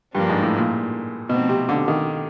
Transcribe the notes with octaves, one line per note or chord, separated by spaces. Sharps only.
G2 F3 A#3 D4
G#2
A2
A#2
B2 F3 A3 C4 D#4
C3
D3
D#3